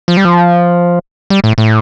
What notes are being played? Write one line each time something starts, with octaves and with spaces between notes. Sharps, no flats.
F3
G3
F3
G3
A2
A2